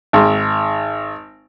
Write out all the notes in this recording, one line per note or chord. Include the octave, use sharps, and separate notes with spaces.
G#1